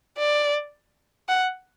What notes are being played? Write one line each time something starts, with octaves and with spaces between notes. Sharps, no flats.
D5
F#5